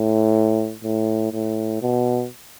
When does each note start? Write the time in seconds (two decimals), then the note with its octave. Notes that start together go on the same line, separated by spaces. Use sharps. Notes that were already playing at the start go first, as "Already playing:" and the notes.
Already playing: A2
0.84 A2
1.33 A2
1.82 B2